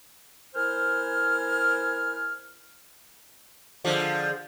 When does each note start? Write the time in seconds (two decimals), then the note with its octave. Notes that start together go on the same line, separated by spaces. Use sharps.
0.55 A#3 E4 C5 G#5 F6
3.84 D3 F3 G#3